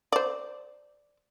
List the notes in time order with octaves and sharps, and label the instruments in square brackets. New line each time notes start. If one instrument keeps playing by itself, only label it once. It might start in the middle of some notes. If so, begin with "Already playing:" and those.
[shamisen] C5 D5